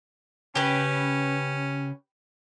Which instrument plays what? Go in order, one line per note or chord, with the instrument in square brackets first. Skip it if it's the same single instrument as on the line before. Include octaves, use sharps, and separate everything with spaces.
[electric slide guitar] C#3 [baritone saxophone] C#4 [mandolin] G4 B4